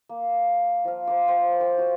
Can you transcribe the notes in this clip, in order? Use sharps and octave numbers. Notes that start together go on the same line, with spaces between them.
A#3
F3 F5
C5 A#5 D6
C5 G5
C5 G5 C6 D#6
F4 F#4 D#5 D#6